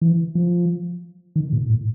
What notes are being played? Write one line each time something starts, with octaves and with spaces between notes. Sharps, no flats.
E3
F3
D#3
A#2
A2